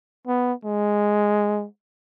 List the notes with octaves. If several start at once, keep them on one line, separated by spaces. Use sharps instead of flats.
B3
G#3